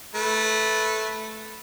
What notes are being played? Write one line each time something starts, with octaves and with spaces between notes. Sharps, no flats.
A3 B4